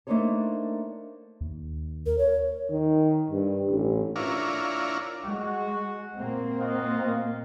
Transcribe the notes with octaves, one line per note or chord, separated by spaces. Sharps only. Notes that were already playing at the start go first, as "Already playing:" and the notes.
A3 A#3 D4 D#4 C5 C#5
D#2
A#4
C#5
D#3
G2
A1
D4 E4 F4 A#4 C#5
G#3 F#4
A#2 A#3 C4
F4 F#4 D#5